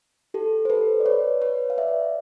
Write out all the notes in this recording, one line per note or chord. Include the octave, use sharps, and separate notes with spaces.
G4 A4
C5
A4 B4
D5
B4 C#5
B4 C#5
F5
D5 E5